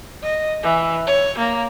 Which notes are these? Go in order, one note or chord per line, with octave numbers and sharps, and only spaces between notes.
D#5
E3
C#5
A#3